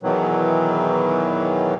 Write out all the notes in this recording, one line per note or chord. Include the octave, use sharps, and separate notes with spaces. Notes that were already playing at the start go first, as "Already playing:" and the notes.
E2 B2 D#3 E3 F#3